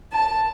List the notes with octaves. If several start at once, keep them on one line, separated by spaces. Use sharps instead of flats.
A5